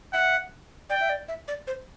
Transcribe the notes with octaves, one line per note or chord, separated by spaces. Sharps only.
E5 F#5
D5 G5
E5
D5
E5
D5
C5